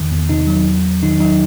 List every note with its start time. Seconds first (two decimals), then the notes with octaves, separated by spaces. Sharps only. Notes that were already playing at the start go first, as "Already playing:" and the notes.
Already playing: E2 D#3
0.11 E2
0.29 C3 D#4
0.47 F#3
0.66 E2
0.84 E2
1.03 D#3 D#4
1.20 F#3 D#4